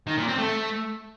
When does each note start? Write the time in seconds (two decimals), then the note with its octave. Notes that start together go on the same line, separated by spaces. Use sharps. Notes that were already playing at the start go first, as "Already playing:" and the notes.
0.07 D#3
0.17 A#2
0.28 C4
0.38 A3